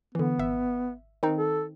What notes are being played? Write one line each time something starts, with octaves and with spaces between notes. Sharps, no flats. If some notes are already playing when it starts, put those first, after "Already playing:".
D3 E3 B3
G#1 E5
D#3 C4 D#4
A4